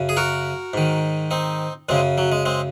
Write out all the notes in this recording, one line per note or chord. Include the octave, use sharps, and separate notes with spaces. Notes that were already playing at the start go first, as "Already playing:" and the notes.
Already playing: F#2 C#3
G#4
F#4 A#4
G#2 D#3
C4 D#4
F#2 C#3 G#3 C4
F#3
G#3
G#3 C4